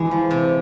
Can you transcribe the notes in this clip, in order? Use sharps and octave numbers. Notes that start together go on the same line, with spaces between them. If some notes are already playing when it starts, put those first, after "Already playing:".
Already playing: E3 G#3
F3
C3